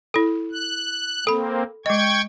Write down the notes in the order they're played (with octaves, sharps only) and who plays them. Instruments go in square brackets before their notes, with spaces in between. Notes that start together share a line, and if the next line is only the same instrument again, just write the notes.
[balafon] E4 A4
[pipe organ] F#6
[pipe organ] A#3 C4 [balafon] A4 B5
[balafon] G#3 D#5 [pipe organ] G5 C#6 G#6